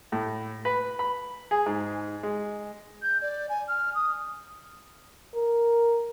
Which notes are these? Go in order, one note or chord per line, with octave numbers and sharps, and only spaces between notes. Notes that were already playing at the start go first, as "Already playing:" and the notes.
A2
B4
B5
G#4
G#2
G#3
G6
D5
G#5
F6
D#6
A#4